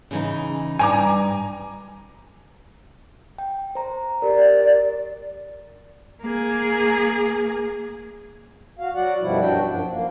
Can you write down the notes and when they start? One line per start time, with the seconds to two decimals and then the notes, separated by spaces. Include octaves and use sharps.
0.11 C#3 E3 D#4
0.79 G2 G#5 A#5 D6
3.38 G5
3.75 C5 A#5
4.22 G4 A#4 D5
6.22 A#3 G#4
8.79 F#4 F5
8.95 F#3 F#4 D5 F#5
9.20 F#2 B2 F3 G3 E4
9.40 G2 F#3 D4 F#4 G5
9.67 F#2 F3
9.89 A#3